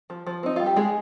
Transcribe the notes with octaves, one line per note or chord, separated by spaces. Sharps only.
F3
F3
C4 D#4
G3 F4
G4
G#3 D#4 G#4